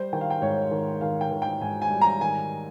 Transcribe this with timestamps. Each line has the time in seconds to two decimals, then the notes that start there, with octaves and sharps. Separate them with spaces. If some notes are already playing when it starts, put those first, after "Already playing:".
Already playing: G3 C5
0.13 D#3 G5
0.21 F5
0.30 G5
0.42 G#2 C#5
0.71 D#3
1.01 D#3 F5
1.21 G5
1.31 D#3
1.42 G5
1.61 G#2 G#5
1.82 G#5
1.90 G3
2.01 A#5
2.21 D#3 G#5